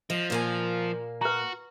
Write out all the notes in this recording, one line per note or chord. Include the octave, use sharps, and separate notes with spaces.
F3 D#5
A#2 A#3 G#5
F#4 B4 A#5